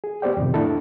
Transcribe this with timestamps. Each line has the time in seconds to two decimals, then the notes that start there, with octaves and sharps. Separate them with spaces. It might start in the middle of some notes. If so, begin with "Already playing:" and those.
0.04 G#4
0.22 B3 G4 C5 D5 G5
0.37 F2 A2 C3 D#3
0.54 A3 D4 E4 A4